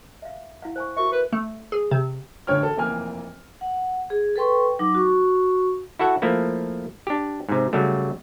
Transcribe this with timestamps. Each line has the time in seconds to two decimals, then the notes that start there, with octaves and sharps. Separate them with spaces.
0.22 E5 F5
0.62 E4 F5 F#5
0.76 C5 G#5 C#6
0.97 F#4 A#4 E5 C#6
1.12 B4
1.32 A3
1.72 G#4
1.91 C3
2.47 A1 D3 C#5 G5 F6
2.63 A4
2.77 F1 E3 A#3 G5 G#5 F6
3.61 F#5
4.10 G#4
4.36 A4 B4 G5 C6 C#6
4.79 F#3 D#4 D6
4.95 F#4 C#6
5.99 E4 F#4 A4 E5 F#5
6.22 F3 A3 A#3 E4
7.07 D4 G4
7.49 G#2 C3
7.73 C#3 F#3 G3 A3